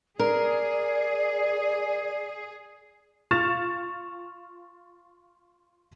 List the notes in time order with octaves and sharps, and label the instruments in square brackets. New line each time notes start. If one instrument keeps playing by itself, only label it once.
[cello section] G#4 [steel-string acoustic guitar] A#4 [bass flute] D5
[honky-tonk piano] F4 C#6 F6 A6 E7 F7